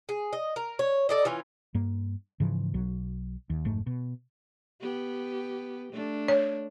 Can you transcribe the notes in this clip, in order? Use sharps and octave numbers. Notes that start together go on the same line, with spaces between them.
G#4
D#5
A#4
C#5
A4 D5 D#5
E3 C#4 F4
G2 A#3
G#2 C#3 E3 F3
B1 F#3
D#2
F1 G#2 A3
B2
B3 G4
A3 D4
C#5